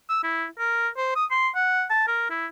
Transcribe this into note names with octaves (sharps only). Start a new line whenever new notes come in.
E6
E4
A#4
C5
D#6
C6
F#5
A5
A#4
E4